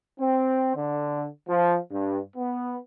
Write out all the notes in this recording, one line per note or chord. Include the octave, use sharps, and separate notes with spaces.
C4
D3
F3
G2
B3